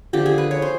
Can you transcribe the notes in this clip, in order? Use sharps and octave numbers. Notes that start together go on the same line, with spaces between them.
D3 F3 A3 G4
G#4
B4
C#5
C5